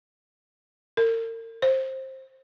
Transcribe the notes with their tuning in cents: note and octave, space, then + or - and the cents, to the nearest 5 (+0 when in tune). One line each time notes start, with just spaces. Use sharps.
A#4 -40
C5 +15